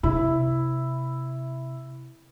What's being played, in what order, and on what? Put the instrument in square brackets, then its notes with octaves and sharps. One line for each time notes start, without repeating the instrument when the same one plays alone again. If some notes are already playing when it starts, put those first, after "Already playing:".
[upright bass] C3 [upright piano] E4